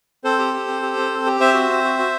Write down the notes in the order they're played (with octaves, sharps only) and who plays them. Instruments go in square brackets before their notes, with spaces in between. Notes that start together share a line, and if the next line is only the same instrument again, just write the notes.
[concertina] C4 A4 C5
G4
G4
C4
G4
C4
C4
G4
C4 C5 E5
F#4
C4
F#4
F#4